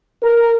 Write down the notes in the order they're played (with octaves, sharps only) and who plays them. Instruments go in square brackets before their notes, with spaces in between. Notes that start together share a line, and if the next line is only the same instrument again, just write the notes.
[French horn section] A#4